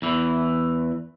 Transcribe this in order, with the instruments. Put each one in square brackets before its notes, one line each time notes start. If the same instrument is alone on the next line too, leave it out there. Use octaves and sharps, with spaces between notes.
[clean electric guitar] E2 E3